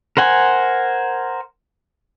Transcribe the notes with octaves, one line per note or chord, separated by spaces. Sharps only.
A#4 C5 F#5 G#5